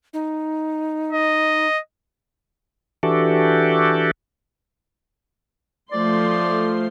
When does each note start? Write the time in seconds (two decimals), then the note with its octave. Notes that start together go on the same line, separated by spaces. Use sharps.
0.13 D#4
1.11 D#5
3.03 E3 D4 F#4 G4 A4
5.92 F3 A3 D5 C6